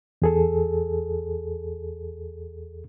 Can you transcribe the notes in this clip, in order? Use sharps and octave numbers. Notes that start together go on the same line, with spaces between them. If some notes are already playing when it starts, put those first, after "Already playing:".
E2 G#4 A4